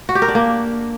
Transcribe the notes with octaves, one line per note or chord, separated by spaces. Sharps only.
F#4
G4
A#4
D4
A#3